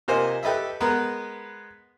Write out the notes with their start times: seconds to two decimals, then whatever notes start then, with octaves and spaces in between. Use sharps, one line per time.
0.08 C3 A#3 F4 C5 D#5 G#5
0.43 G4 A4 B4 D#5 E5
0.81 G#3 B3 A#4 B4